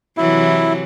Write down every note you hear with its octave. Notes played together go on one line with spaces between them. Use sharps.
C3 E3 F#3 E4